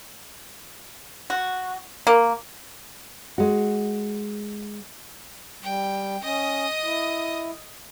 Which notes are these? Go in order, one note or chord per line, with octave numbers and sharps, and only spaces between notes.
F#4
A#3
G#3 F#4
G3 G5
C#4 D#5 D#6
E4